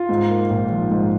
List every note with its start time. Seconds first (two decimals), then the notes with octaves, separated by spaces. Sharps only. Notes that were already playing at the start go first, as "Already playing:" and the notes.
Already playing: F4
0.09 G#2
0.30 A#3
0.50 A#1
0.71 F3
0.91 G#2